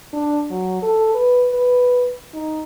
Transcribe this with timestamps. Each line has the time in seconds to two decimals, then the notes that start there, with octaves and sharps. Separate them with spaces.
0.13 D4
0.50 F#3
0.82 A4
1.14 B4
1.53 B4
2.33 D#4